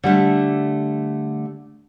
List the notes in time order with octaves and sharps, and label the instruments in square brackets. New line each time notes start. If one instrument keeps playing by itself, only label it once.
[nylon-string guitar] D3 G3 A3